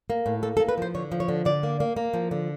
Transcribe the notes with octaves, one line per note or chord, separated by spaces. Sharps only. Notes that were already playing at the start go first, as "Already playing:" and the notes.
A#3
A2
A#3 A4
A4
A#3
B4
F3 C5
D3 C#5
F3
C#5
D3
D3 D5
A#3
A#3
A#3
F3
D3